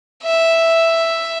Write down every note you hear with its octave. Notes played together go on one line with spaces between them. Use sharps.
E5